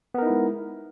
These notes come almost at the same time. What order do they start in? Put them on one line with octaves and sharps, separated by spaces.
B3 A#4 D#4 E4 G#3